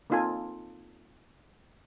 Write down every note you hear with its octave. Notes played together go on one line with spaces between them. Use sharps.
A#3 C4 D#4 F4 A4 G#5